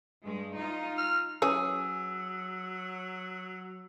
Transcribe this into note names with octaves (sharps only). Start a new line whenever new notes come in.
G2 G#3
D#4 F4
F6
E3 F#3 C#4 G#4 C#5 E6